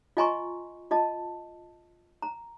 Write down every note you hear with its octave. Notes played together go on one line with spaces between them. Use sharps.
F4 D#5 G#5 A#5 C6 C#6
F4 D#5 A5
A#5